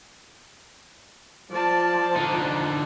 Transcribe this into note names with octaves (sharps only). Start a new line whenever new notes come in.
F3 D5 A5
D3 D#4